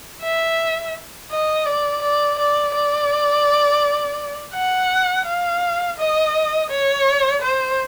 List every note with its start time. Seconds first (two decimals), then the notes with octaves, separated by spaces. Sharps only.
0.22 E5
1.31 D#5
1.66 D5
2.02 D5
2.39 D5
2.74 D5
4.54 F#5
5.26 F5
5.98 D#5
6.70 C#5
7.42 C5